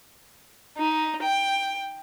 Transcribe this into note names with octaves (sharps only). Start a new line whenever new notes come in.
D#4
G5